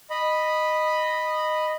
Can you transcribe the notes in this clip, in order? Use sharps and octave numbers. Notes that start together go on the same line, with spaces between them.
D#5 B5